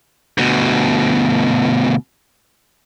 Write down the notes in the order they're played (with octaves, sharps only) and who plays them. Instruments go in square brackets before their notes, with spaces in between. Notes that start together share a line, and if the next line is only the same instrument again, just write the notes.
[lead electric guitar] D2 B2